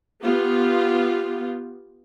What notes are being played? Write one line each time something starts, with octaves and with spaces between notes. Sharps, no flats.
B3 F4 G4